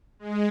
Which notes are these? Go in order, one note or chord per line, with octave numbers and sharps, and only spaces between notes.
G#3